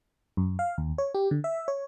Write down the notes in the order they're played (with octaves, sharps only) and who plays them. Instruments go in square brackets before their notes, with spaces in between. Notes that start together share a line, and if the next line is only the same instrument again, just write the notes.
[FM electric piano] F#2
F5
D#2
C#5
G4
D3
E5
C#5